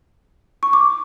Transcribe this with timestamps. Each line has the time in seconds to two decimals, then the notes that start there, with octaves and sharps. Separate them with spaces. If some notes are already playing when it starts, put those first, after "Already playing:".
0.63 C#6
0.73 D6